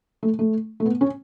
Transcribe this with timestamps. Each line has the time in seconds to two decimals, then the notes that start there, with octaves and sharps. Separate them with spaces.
0.23 A3
0.39 A3
0.80 A3
0.85 B3
1.01 C#4